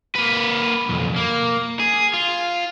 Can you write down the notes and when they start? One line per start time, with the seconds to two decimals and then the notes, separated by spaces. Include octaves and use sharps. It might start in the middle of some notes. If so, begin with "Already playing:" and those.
0.15 A#3 B4
0.89 B1 F2
1.16 A#3
1.80 G#4
2.14 F4